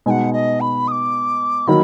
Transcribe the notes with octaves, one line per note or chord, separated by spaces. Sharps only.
B2 G#3 D#4 F#5 G#5
D#5
B5
D#6
D6
D#3 F#3 A#3 B5